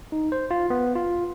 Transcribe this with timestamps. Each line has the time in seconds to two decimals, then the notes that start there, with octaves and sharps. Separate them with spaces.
0.12 D#4
0.32 C5
0.51 F4
0.70 B3
0.96 F4